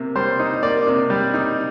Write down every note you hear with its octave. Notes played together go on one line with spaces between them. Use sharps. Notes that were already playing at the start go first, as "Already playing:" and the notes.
Already playing: C3 A#3
G3 C5
D#4
A#3 D5
C3
G3
D#4